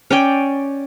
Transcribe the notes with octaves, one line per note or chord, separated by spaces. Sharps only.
C#4 D5 G5